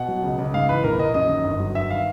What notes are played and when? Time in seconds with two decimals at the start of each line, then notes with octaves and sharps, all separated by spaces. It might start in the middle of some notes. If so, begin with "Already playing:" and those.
Already playing: B2 F#5
0.08 F#3
0.23 C#2
0.38 C#2
0.54 G#2 F5
0.69 E3 B4
0.84 A#1 A#4
0.99 A#1 D#5
1.14 F#2 D#5
1.29 D#3
1.45 G1
1.60 F#3
1.74 G2 E5
1.90 D#3 F5